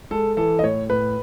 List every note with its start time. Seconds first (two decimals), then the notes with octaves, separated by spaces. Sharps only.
0.11 G#3 A4
0.37 E3 A4
0.59 D#5
0.63 A2 C#5
0.90 A2 B4